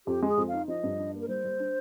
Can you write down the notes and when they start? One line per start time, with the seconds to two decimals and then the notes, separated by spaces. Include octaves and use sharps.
0.07 F2 G4
0.22 G#3
0.28 G#4
0.38 F2
0.48 D#4 F5
0.68 F3 D#5
0.84 G2
0.99 D4
1.14 A#3
1.21 A#4
1.28 G3 C5
1.45 G3
1.59 D4